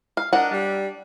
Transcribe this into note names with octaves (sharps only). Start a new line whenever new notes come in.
F5
D4 A#4 D#5 F#5
G3